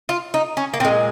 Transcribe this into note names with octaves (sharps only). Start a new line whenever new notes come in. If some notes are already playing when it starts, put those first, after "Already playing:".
F4
D#4
C#4
A#3
A#2 G#3 C4